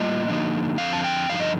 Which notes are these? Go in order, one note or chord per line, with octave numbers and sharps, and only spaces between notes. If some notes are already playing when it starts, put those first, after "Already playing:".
Already playing: A2 G3 A#3 F4 D#5
D3 F3 A#3 D#4
F2 D3 F3 C4 F5
A5
G5
G2 D3 F3 D#4 F5
D#5